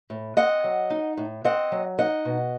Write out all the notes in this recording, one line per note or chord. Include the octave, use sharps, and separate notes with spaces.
A2
C4 D#5 F#5
F#3
D#4
A2
C4 D#5 F#5
F#3
D#4 D#5 F#5
B2